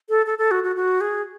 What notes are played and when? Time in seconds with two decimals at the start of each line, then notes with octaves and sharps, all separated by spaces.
0.09 A4
0.26 A4
0.38 A4
0.51 F#4
0.64 F#4
0.76 F#4
1.01 G#4